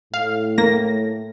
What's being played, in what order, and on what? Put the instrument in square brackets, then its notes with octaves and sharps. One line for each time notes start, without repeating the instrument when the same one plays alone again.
[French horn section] A2 [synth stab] F5
[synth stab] A#3 A#6